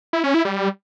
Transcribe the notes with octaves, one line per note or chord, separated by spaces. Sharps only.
E4
C#4
E4
G3